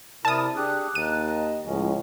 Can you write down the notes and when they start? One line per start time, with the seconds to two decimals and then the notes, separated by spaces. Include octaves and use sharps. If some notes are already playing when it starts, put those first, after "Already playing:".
0.25 C3 E4 A#4 D5 A5 D#6
0.56 D4 G4 G#4 F#6
0.95 D#2 D#4 A5 D#7
1.27 D#5
1.66 C#2 A2 F3 C#4